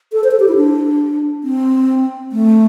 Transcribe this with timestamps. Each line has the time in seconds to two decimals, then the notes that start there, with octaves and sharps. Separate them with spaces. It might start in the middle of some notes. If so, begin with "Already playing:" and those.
0.13 A4
0.24 C5
0.31 A4
0.40 G4
0.48 E4
0.56 D4
1.44 C4
2.32 A3